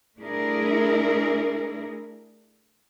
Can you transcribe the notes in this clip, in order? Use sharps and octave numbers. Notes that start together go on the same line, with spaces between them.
A3 D4 E4 G#4 A#4